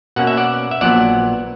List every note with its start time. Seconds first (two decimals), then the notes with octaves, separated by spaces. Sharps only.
0.16 B2 A#3 C#4 F#5
0.27 E5
0.37 D5 F#5
0.71 E5
0.81 A#1 A#2 F#3 B3 D5 F#5